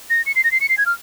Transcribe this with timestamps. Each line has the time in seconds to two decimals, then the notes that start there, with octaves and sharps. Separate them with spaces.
0.10 A#6
0.26 C#7
0.35 C7
0.44 A#6
0.52 C7
0.61 C#7
0.69 C7
0.78 G#6
0.86 F6